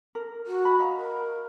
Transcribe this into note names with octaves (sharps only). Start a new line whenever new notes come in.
A#4
F#4
B5
D#5 F5 A#5
A#4